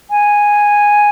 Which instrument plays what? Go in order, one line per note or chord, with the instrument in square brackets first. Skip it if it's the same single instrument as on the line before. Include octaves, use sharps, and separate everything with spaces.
[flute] G#5